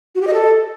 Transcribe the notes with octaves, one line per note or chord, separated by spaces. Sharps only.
F#4
G4
D#5
A4